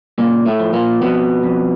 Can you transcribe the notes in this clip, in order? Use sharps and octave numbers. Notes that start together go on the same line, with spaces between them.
A#2 C#3 A#3
A2 A3
F3
A#2 A#3
F2 B2 B3
F2